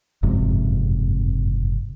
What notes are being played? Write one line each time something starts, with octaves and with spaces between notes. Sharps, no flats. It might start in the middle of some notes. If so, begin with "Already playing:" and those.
F#1 F2 G#2 C3